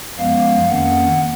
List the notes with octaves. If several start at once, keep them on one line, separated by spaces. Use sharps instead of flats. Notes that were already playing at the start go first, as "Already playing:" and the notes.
F#2 F3 G#3 B3 F5
F2 D#3 A#3 C#4 F#5